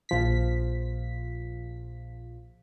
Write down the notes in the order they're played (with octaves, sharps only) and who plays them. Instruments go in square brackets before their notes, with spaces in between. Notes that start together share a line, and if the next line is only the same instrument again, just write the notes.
[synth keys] A#1 F3 B6